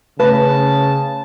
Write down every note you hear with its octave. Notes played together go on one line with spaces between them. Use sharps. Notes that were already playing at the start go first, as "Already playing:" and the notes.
C#3 A3 C#4 B4 A5